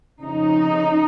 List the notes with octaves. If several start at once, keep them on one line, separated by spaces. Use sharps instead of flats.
F2 C#3 D#4